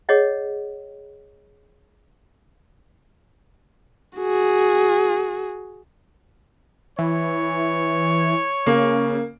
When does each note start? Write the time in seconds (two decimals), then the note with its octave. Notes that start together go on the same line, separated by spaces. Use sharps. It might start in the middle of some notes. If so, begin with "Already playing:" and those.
0.09 G#4 C#5 D#5 F#5
4.17 F#4 G#4
6.98 E3 C#5
8.66 C#3 A#3